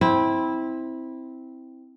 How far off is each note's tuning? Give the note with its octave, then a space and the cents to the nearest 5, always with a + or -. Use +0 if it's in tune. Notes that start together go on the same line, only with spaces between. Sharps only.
C4 +0 E4 -15